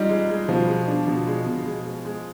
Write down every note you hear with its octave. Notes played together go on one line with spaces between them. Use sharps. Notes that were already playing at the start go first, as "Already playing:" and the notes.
Already playing: G3 D#4 F4
G#3
G#3
B2 F3
G#3
D4
B2
G#3
B2
G#3
G#3
G#3